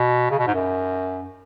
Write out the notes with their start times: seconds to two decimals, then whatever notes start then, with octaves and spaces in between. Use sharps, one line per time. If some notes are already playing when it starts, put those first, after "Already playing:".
Already playing: B2
0.31 C#3
0.39 B2
0.47 G#2
0.54 F#2